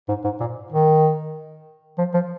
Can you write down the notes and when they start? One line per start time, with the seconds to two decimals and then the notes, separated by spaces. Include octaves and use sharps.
0.09 G#2
0.24 G#2
0.40 A#2
0.72 D#3
1.98 F3
2.14 F3